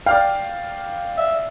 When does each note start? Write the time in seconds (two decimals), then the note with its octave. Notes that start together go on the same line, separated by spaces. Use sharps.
0.06 D5 F5 G5 F6
1.18 E5